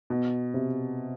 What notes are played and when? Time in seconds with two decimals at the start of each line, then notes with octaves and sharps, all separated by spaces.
0.10 B2
0.54 C3